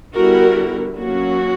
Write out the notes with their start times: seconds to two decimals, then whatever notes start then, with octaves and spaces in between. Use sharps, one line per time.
0.16 D3 G3 B3 E4 F#4 A#4
0.96 F#3 A#3 C#4 F#4